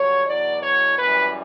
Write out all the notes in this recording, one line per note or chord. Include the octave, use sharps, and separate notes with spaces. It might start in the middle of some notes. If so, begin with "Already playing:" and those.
Already playing: G2 D3 F#3 C#5
E2 B2 F#3 D5
C#5
F#2 E3 G3 B4